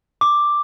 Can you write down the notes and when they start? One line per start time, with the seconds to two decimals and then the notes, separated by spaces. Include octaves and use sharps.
0.21 D6